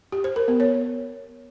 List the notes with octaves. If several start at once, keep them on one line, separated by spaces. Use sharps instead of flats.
G4
C5
A#4
B3
C#5